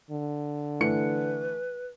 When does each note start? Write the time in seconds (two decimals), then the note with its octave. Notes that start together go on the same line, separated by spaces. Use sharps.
0.11 D3
0.80 E3 A3 B4 C#7